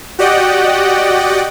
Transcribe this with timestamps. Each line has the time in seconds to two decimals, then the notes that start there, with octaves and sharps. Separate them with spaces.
0.19 F#4 G4 D5 D#5 F#5 G5